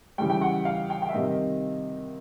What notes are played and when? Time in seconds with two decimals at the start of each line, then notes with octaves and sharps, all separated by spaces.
0.18 C#3 E3 G3 G5
0.30 G5
0.41 F#5
0.65 F5
0.90 G5
1.02 G5
1.09 E5
1.13 C3 D#3 G3 D#5